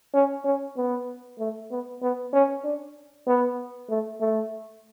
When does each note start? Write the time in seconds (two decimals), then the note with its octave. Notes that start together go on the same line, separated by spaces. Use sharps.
0.14 C#4
0.45 C#4
0.77 B3
1.39 A3
1.71 B3
2.02 B3
2.33 C#4
2.64 D4
3.27 B3
3.90 A3
4.21 A3